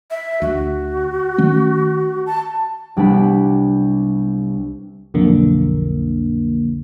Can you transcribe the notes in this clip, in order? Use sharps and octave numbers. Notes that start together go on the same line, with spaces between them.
E5
D2 F#4
D#3 A3 C#4
A5
C2 G3 B3 D4 B5
B1 F2 D3 A#3